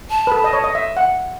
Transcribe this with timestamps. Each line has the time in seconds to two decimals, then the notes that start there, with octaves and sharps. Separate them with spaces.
0.10 A5
0.27 B4
0.32 A4
0.44 D#5
0.53 C#5
0.64 D#5
0.75 E5
0.97 F#5